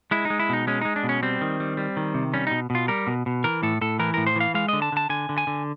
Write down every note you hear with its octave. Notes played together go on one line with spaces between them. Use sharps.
G#3 E4
D#4
G#3
E4
B2 D#4
G#3 C#4
G#3 D#4
D4
B2
C#4
G3 C4
D#3
G3
G3
D#3
C3
G3 C#4
B2 D#4
B2
F4
G3 A#4
B2
B2
E3 A#4
A2 A4
A2 A4
E3 A#4
A2 A#4
C5
E3 F5
G#3 F5
D3 D#5
A5
D3 A5
D3 G#5
D3
G#5
D3